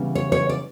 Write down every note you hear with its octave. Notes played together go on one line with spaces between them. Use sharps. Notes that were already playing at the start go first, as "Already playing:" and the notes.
Already playing: C#3 E3 G3 B3
C#5
C#5
D5